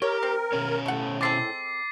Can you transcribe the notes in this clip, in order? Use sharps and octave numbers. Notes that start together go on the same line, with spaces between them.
G4 A#4 C#5
C4
B2 C#4 C#5
A2 A3 F#5
G#3 C4 A4 D6 A6 C7